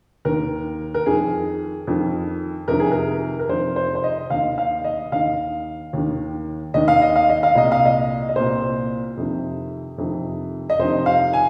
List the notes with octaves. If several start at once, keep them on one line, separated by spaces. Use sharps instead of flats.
D#2 D#3 A#4
A#4
F2 D#3 G#4
F2 D#3
F2 C3 D#3 A#4
G#4
A#4
A#4
F2 C3 D#3 C5
C5
C5
D#5
D#2 D#3 F5
F5
D#5
D#2 D#3 F5
D#2 D#3
D#2 D#3 D#5
F5
D#5
F5
D#5
F5
C2 A#2 D#5
F5
D#5
D#5
C2 A#2 C5
F2 C3 D#3
F2 C3 D#3
D#5
F2 C3 D#3 C5
F5
G#5